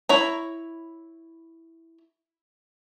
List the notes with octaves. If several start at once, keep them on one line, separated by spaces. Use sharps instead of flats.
E4 C#5 A#5